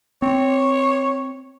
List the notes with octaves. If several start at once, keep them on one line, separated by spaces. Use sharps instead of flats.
C4 C#5